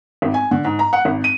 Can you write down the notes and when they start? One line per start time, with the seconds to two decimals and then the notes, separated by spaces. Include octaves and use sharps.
0.22 G#1
0.34 G#5
0.51 D3
0.65 G#2
0.79 A#5
0.93 F#5
1.05 G#1
1.24 D#7